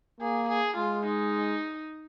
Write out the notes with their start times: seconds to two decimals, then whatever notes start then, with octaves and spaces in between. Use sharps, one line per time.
0.20 A#3 G#4
0.48 G#4
0.76 G#3 F4
1.05 D#4